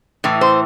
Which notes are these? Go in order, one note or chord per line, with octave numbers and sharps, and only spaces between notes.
A2 E3
C5